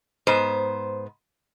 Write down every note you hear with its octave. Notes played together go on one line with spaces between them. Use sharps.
G#2 B3 C5